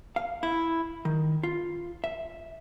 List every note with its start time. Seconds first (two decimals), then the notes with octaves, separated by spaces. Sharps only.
0.16 F5
0.43 E4
1.05 D#3
1.43 F4
2.04 E5